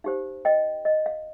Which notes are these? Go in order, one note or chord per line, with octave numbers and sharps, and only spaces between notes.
D#4 G4 C5 F5
D#5 G5
D#5
F5